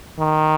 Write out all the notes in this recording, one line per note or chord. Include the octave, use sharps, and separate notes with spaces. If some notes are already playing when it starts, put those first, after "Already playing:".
D#3